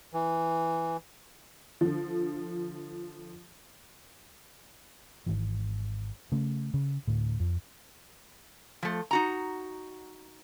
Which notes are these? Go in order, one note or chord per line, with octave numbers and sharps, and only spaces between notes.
E3
D3 F3
G#1 G#2 D#3 E3
C#3 A3
C#3
D2 A2
F2
F3 A3
D#4 F#4 A#5